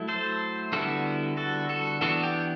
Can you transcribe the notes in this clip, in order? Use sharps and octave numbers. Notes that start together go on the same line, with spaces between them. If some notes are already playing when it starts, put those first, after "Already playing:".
Already playing: F#3 A3 E4
A4 C5
D3 G3 B3 E4 F#4 A4
F#4 A4
F#4 A4
E3 B3 D4 F#4 A4
G4